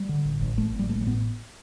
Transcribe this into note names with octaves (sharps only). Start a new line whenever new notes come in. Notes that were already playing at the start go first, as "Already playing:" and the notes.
Already playing: G3
D3
A1
A1
A1 A3
A1
G3
A1 A3
G3
A2 B3